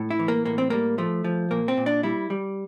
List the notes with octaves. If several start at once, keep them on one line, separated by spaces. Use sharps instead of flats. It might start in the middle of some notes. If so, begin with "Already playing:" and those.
Already playing: A2
E4
E3
A#3
A2 A#3
C4
G3 A#3
F3 A3
F3
A#2 A#3
C4
A#2
D4
G3 E4
G3